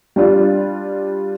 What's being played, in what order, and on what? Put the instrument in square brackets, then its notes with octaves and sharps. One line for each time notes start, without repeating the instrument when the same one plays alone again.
[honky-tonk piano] G3 D4 F4